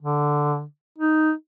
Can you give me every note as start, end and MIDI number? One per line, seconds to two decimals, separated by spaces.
0.02 0.63 50
0.98 1.32 63